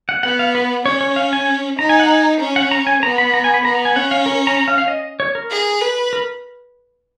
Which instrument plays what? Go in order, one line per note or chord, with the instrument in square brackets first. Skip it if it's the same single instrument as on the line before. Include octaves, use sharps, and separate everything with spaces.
[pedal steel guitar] F#5
[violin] B3 [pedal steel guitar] F#5
[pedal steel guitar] F5
B4
[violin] C#4 [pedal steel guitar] C#5
[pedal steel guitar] C#5
F5
G#5
[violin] D#4 [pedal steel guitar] A#5
[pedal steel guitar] G#5
F#5
G#5
[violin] C#4
[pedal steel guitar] F#5
A#5
G#5
[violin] B3 [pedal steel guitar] A#5
[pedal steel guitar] B5
A#5
G#5
B5
[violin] B3 [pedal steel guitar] A#5
[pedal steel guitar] A#5
G#5
[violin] C#4 [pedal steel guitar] F#5
[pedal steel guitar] F5
A#4
A#5
A#5
F5
F5
D#5
C#5
A#4
[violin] G#4
B4
[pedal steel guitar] A#4